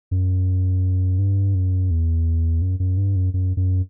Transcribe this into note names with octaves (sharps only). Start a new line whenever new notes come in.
F#2
G2
F#2
E2
F#2
F#2
G2
F#2
F#2
F#2